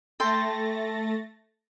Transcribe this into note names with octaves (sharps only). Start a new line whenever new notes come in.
A3 A4 G5 C6 A6 A#6